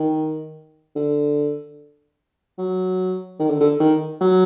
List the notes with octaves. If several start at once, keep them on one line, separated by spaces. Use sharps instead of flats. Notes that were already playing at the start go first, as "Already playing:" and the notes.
Already playing: D#3
D3
F#3
D#3
D3
D3
D#3
F#3